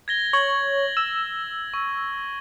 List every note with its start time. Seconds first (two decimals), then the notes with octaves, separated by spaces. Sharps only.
0.08 G#6 A#6 G7
0.33 C#5 G#6 F#7
0.97 E6
1.74 C#6